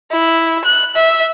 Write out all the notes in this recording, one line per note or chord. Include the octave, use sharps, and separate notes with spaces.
E4
F#6
E5